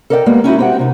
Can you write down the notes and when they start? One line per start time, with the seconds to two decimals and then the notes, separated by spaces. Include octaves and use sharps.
0.10 A4 A#4 D5 D#5 F5 G5
0.26 G3 G#3 A#3 B3
0.44 C#4 D#4 E4 F#4
0.59 C4 G4 F#5
0.79 C3 D#4